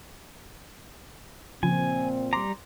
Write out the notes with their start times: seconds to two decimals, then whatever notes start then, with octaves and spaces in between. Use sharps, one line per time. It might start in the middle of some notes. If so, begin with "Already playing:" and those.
1.63 A#2 C#3 F3 C4 G#5
2.33 G3 A#5 C6 D6